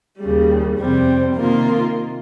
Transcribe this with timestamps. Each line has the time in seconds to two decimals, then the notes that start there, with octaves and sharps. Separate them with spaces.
0.19 D#2 C#3 G3
0.76 F2 C3 G3 C4
1.34 C3 D#3 A#3 F4 A#4